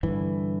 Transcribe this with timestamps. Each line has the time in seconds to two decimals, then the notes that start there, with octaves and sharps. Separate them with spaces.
0.03 G2 D3 E3